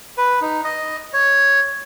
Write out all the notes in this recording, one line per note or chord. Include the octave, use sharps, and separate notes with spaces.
B4
D#4
D#5
C#5